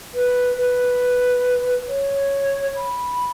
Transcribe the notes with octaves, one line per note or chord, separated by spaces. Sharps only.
B4
B4
C#5
B5